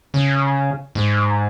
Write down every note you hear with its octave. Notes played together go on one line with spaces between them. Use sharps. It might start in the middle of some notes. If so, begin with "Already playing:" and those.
C#3
G#2